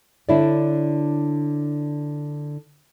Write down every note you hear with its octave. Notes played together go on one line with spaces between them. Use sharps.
D3 D4 E4 C#5 D5